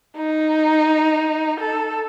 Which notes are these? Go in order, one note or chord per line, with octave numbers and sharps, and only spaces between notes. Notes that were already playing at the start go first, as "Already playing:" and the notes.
D#4
A4